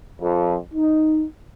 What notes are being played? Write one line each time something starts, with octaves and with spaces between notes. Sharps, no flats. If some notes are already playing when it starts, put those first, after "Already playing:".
F2
D#4